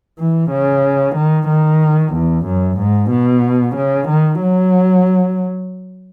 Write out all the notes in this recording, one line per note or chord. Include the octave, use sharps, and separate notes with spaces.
E3
C#3
D#3
D#3
E2
F#2
G#2
B2
C#3
D#3
F#3